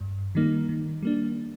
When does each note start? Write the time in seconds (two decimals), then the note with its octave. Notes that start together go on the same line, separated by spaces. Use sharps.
0.01 G2
0.35 D#3 G3 A#3 D#4
0.69 D#3
1.02 G3 A#3 D4